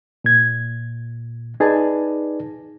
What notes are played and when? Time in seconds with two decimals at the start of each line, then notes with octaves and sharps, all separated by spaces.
0.24 A#2 G#6
1.60 D#4 G#4 B4 D5 A5